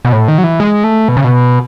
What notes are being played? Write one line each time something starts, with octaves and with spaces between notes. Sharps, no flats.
B2
A2
D#3
F#3
E3
G#3
A3
B2
C#3
B2